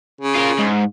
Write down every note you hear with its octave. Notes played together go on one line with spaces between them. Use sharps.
C#3
F4 A#4
G#2